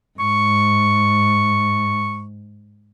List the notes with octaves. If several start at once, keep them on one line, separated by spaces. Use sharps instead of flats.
G#2 C#6